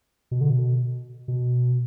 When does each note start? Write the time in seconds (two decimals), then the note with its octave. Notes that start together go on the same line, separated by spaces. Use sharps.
0.31 B2
0.41 D3
0.50 B2
1.28 B2